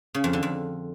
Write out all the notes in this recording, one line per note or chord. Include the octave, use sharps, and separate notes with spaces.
C#3
F2
D3
F2